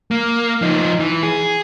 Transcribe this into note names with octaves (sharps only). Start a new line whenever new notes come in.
A#3
F3 D#4
E3
G#4